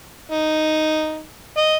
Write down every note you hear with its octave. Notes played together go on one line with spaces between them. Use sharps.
D#4
D#5